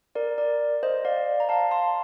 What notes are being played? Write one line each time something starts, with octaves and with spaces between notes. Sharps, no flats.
A#4 D5
A#4 D5
C5 D#5
D5 F5
A#5
F5 A5
A5 C6